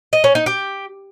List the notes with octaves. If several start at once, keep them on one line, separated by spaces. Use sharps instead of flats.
D#5
C#4
D#4
G4